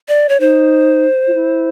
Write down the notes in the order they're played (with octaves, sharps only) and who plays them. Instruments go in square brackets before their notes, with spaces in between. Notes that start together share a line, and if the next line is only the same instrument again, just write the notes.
[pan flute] D5
C#5
[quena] D#4 [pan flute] C5
[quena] F4
E4